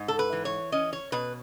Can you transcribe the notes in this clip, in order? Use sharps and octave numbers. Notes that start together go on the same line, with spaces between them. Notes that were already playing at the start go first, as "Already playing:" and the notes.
Already playing: G#2
A4
B4
E3
C#5
C#4 D#5
C#5
B2 B4